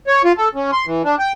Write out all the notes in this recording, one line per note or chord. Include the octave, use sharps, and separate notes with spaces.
C#5
F4
A4
C#4
C6
E3
D4
G5